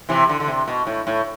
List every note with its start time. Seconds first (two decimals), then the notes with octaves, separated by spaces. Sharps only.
0.09 C3 E3
0.29 D3
0.40 D3
0.48 C3
0.68 B2
0.87 A2
1.07 A2